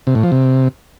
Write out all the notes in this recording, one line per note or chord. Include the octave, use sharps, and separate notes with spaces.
C3
A2
F3
C3